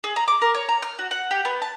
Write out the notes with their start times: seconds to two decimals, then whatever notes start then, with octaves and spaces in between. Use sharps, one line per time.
0.04 G#4
0.16 A#5
0.28 D6
0.42 A#4
0.54 C#5
0.69 A#5
0.82 F6
0.99 F#4
1.11 F#5
1.31 G4
1.45 B3
1.62 A5